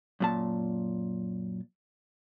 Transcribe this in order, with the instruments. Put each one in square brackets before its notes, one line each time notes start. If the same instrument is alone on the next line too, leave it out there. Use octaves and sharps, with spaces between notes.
[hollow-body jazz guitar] F#2 A#2 A5